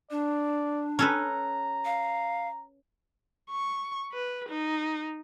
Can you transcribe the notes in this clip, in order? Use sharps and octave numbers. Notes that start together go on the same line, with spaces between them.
D4 D5
C#4 A4 B4 A#5
F5
C#6
B4
D#4